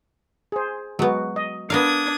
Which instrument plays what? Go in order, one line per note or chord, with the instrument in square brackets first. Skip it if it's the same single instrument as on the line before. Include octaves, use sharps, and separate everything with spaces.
[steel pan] G#4 C5
[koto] F#3 B3 [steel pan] G#3 F#4
[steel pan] D#5
[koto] B3 A#4 F5 [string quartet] D4 D#6 G#6